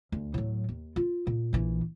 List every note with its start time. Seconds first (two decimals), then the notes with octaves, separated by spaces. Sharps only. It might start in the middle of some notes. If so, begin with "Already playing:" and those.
0.12 D2
0.34 A2 F#3
0.69 D#2
0.96 F4
1.27 A#2
1.53 A#1 E3